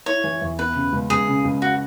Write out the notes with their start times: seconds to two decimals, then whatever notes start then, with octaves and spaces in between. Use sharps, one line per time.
0.06 E4 C#5
0.24 E3
0.42 E2
0.59 B3 B4
0.76 C#3
0.93 C#2
1.10 C#2 G#4
1.28 C#3
1.45 C#2
1.62 F#4